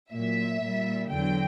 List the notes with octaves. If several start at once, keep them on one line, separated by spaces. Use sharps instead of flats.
A#2 F#3 E5
A#2 G3
E2 D3 F#3 G5